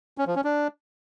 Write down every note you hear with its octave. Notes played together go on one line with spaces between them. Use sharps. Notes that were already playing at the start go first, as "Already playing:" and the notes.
C#4
F3
C#4
D4